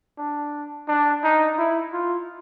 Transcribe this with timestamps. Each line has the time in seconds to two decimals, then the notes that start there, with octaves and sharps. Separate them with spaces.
0.17 D4
0.88 D4
1.23 D#4
1.58 E4
1.93 F4